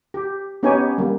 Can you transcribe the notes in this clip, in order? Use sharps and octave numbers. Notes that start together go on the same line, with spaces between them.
G4
B3 C#4 D#4 G4 C#5 G#5
G3 A#3